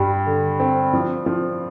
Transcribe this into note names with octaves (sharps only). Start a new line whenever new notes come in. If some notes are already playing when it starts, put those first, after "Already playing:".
Already playing: G2 G3
D3
C4
F3
F3